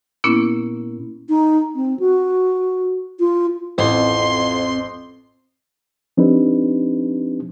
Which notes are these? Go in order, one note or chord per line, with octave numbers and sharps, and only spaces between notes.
A#2 A#3 B3 C#4 E4
D#4
C4
F#4
F4
A1 F2 C4 C6
F3 C4 D4 D#4 G4 B4